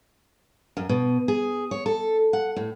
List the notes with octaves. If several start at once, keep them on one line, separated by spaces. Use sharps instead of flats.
F#2
B2
G#4
C#5
A4
F#5
A2